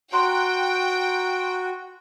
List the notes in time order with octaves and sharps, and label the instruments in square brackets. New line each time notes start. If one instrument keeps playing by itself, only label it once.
[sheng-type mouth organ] F#4 [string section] G5 [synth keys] A#5 C6 F#6